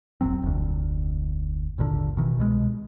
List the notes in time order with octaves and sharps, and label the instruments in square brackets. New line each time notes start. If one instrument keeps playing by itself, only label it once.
[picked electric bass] E1 A#1 F#3 C4
F1 D2
G#1 D#2 A#2 D3
B2 D#3 E3
C2 B2 G#3